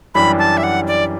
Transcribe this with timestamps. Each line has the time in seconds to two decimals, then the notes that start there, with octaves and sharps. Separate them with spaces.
0.15 F#2 E3 G3 D4 G4 B5
0.39 A5
0.57 E5
0.63 F#5
0.87 D5